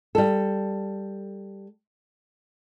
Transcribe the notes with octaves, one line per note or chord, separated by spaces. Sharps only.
G3 A4